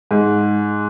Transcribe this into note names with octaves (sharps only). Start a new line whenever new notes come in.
G#2